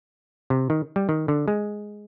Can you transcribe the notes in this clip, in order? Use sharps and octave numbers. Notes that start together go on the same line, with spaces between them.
C3
D#3
G3
D#3
D3
G#3